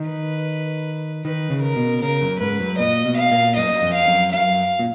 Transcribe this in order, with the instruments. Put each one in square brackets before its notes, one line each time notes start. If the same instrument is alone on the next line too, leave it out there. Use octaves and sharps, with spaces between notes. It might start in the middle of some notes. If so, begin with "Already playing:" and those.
Already playing: [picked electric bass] D#3
[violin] B4
[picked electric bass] D#3 [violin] B4
[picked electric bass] C#3
[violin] A#4
[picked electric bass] B2
[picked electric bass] C#3 [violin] A#4
[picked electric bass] F#2
[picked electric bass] G#2 [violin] B4
[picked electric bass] F#2
[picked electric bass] A#2 [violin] D#5
[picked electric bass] B2
[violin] F5
[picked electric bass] A#2
[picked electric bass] F#2 [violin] D#5
[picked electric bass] F#2
F2
[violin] F5
[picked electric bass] F#2
[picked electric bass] F#2 [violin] F5
[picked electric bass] A#2